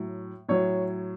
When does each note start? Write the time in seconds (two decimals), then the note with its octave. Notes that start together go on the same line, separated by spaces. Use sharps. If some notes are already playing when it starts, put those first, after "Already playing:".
Already playing: A2 F#3
0.48 A2 F#3 C#5